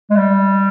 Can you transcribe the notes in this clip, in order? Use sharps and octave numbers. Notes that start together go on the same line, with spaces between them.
G#3
G3